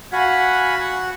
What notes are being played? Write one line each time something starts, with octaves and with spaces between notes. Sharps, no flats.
F#4 F5 F#5 G#5 B5